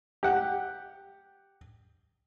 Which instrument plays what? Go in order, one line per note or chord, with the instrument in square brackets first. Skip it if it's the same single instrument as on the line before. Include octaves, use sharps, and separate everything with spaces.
[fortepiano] G4 F#5